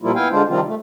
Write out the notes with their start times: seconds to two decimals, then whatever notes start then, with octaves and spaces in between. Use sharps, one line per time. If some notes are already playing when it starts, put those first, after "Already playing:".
0.02 A#2 F3 G3 A#3 E4 F4
0.15 B3 E4 F5 G5 G#5
0.31 D3 G#3 D4 F4 C5
0.49 C3 D#3 F3 G3 C4 F4
0.67 A3